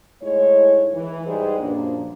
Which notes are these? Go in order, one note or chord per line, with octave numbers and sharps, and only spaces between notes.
G#2 G#3 A3 E4 C#5
E3
G#2 G3 D#4 G#4 B4 C5
F#2 A#2 F3 A#3 D4